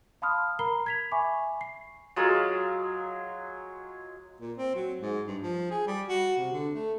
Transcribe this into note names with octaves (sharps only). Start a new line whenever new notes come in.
F5 A5 B5 C6 D#6 F6
A#4 A#5 B5 C7 G7
G#6 B6 F7
E5 G#5 B5 C#6 D6
C7
F#3 G#3 F4 A#4
A#2
C4
F#3
G#2
G2
F3
G#4
G3
F#4
C3
D3
A3